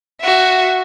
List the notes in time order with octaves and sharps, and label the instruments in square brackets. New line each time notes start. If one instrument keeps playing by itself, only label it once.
[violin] F#4 E5